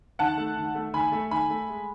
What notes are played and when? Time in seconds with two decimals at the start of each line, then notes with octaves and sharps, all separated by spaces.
0.19 D#3 F#5 A5
0.37 A3
0.57 D#3
0.75 A3
0.94 D#3 G#5 B5
1.12 A3
1.31 D#3 G#5 B5
1.50 A3
1.69 G#3